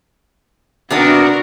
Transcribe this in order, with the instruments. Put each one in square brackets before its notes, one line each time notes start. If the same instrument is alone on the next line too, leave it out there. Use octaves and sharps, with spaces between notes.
[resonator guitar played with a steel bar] C3 B3 D4 [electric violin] F#4 A#4